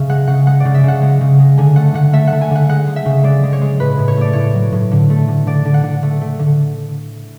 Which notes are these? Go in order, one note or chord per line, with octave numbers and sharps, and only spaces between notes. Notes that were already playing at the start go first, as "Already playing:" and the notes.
Already playing: C#3 E5
G#3 F#5
C#3 F#5
G#3 F#5
C#3 D5
E5
C#3 F#5
G#3
C#3
G#3
D3 G#5
A3 F#5
D3 F#5
A3 E5
A3 F#5
G#5
D3 F#5
G#3 F#5
G#3
E5
C#3
G#3 D5
G#3
C#5
G#3
A2 B4
A2
C#5
A3 D5
A2 C#5
F#3
A2
D3
A3
D3
D3 D5
D3
F#5
D3
A3
A3
D3